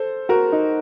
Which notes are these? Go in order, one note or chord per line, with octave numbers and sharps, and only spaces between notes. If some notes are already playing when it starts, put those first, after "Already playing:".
Already playing: A4 C5
F#4 A#4
D#4